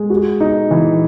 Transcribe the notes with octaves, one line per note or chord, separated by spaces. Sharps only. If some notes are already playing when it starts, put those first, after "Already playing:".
Already playing: G#3
F#4
D#4
E3